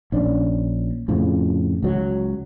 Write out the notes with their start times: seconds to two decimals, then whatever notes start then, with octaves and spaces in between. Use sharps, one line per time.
0.12 A#1 C#4 D4
1.08 F2 A2 C#3 F3
1.82 C#2 F#3